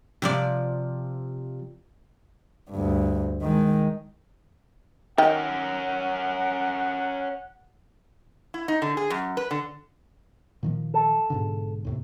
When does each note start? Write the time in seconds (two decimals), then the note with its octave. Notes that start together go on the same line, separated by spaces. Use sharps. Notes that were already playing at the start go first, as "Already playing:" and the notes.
0.22 C3 F3 D5
2.70 D2 G2
3.42 D#3 G#3
5.18 D#3 C#4 A#4 F#5 G5
8.54 E4
8.68 D#4
8.82 D3
8.97 G#4
9.10 F#2
9.37 B4
9.51 D3
10.63 A#2 D#3 F3
10.94 A4
11.30 G#2 B2 D3
11.85 D#2 A2 C3